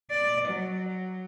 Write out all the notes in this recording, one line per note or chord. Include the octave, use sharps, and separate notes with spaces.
D5
F#3